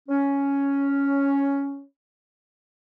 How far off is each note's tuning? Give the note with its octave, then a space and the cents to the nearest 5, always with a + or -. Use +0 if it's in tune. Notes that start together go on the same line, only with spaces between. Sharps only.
C#4 +5